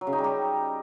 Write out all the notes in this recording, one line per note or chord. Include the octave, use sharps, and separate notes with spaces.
F#3
C#3
D#4
G3
G4